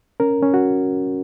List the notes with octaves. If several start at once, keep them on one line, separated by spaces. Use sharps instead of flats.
C#4 A#4
C#4
F#4